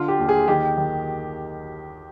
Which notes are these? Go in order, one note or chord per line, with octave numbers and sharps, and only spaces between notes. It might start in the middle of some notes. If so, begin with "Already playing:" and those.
Already playing: D3 F4
G4
D#2
G#4
D#3 G4
D#3